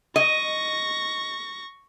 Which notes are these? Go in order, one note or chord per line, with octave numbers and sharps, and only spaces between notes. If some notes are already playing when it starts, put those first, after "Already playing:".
D#5 C#6 A#6